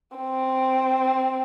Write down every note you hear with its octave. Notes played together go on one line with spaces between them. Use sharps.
C4